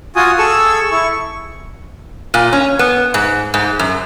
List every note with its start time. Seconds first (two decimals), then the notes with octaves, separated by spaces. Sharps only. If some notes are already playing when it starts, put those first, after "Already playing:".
0.16 F4 F#4 G#5 D#6
0.38 G#4 A4 C#6 E6
0.92 E4 C#6
2.34 A#2
2.53 C#4
2.79 B3
3.14 G#2
3.54 G#2
3.79 F#2